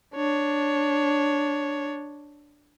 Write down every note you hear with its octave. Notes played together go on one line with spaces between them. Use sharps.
D4 C#5